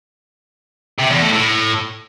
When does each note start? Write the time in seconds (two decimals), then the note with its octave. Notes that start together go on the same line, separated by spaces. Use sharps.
1.00 C3
1.11 E2
1.22 A2
1.33 A2